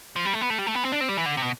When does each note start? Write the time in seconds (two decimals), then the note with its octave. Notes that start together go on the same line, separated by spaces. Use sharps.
0.16 F3
0.25 G3
0.33 A3
0.41 B3
0.50 A3
0.59 G3
0.67 A3
0.75 B3
0.84 C4
0.92 D4
1.01 C4
1.09 G3
1.17 E3
1.26 D3
1.37 C3
1.42 B2